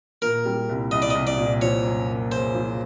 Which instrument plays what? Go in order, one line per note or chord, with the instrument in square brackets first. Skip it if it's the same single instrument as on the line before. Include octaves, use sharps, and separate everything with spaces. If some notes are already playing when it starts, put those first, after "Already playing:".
[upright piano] A#2 [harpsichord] A#4
[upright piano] G3
C2
[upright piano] C2 [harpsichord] D#5
[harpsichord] D5
[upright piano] C2 [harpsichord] D#5
[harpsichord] D5
[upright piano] A#2
[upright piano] F3 [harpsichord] C#5
[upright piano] F#2
A#3
[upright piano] C#3 [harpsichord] C5
[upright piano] F3